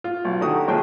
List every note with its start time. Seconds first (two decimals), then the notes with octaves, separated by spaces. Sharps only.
0.04 F4
0.25 B1
0.41 D3 D#3 F#4 G4 D#6
0.68 A#1 F3 G#4 C#5 G5